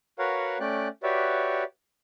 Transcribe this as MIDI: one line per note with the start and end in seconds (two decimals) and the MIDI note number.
0.19 0.58 66
0.19 0.58 70
0.19 0.58 71
0.19 0.58 73
0.19 0.58 77
0.19 0.58 78
0.60 0.88 57
0.60 0.88 61
0.60 0.88 74
0.60 0.88 79
0.60 0.88 90
1.03 1.64 66
1.03 1.64 67
1.03 1.64 71
1.03 1.64 73
1.03 1.64 74
1.03 1.64 76